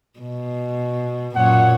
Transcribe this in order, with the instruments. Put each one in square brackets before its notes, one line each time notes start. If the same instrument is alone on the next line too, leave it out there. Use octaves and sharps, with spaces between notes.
[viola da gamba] B2
[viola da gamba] F#2 A#2 C#5 [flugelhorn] F#5